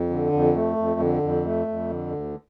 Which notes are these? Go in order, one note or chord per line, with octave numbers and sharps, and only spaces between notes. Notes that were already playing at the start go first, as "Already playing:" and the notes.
Already playing: F2
D3
F2
A3
F2
D3
F2
A3
F2
D3
D2